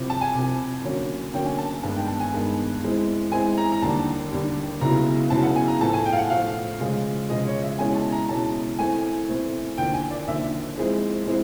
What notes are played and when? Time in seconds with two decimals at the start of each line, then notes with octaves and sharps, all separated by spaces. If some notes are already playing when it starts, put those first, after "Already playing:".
Already playing: C2 C3 F3
0.10 A5
0.21 G#5
0.34 C2 C3 F3
0.84 D3 F#3 A#3 C#4
1.34 D3 F#3 A#3 C#4 G5
1.46 G#5
1.58 A5
1.71 A5
1.83 G2 D#3 G#3 B3 A5
1.96 G5
2.08 A5
2.20 G#5
2.33 G2 D#3 G#3 B3
2.82 E3 G#3 C4 E4
3.32 E3 G#3 C4 E4 G#5
3.58 A#5
3.72 A#5
3.82 D#2 D3 G3 A5
4.31 D#2 D3 G3
4.81 C#2 C#3 F#3 B3 E4 A#5
5.30 C#2 C#3 F#3 B3 E4 A5
5.43 F#5
5.56 G#5
5.68 A#5
5.81 A2 F3 A3 A5
5.93 G#5
6.05 G5
6.13 F5
6.18 F#5
6.30 A2 F3 A3 F5
6.80 C#3 F3 G#3
7.29 C#3 F3 G#3 D#5
7.47 C#5
7.63 E5
7.79 B2 G#3 C#4 E4 G#5
7.95 A5
8.12 A#5
8.29 B2 G#3 C#4 E4 A5
8.79 E3 A3 C4 E4 G#5
9.28 E3 A3 C4 E4
9.78 D#2 D3 F3 G5
9.94 G#5
10.11 D5
10.27 D#2 D3 F3 E5
10.77 F3 G#3 C4 E4 G#4
11.27 F3 G#3 C4 E4